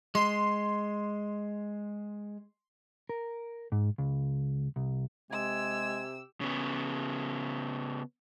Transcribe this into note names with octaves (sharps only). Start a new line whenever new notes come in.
G#3 C6
A#4
G#2
C#2
C2
C3 G#3 G4 G#5 E6
C#3 B3